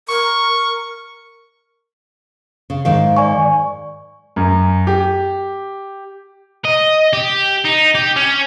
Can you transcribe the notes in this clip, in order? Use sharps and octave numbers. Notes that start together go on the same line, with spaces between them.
A#4 C#6
C#3
G#2 D#3 F5
D5 G#5 C#6
F#2
G4
D#5
G4
D#4
G4
C#4